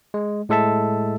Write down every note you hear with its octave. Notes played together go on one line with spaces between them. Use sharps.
G#3
A2 G#3 A4 E5 A5